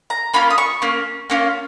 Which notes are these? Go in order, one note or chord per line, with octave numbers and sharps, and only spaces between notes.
A#5
A#3 C#4 F4 B5
D#6
C#6
A#3 C#4
A#3 C#4 F4